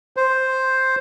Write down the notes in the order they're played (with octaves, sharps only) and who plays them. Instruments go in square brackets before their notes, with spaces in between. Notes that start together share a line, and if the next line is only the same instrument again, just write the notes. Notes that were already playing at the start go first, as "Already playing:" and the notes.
[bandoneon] C5